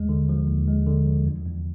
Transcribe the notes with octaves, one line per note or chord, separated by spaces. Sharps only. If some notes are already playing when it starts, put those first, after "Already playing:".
Already playing: D#2 G#3
D3
F3
D#2
G#3
D3
F3
E2
E2